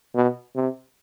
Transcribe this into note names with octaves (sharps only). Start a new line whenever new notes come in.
B2
C3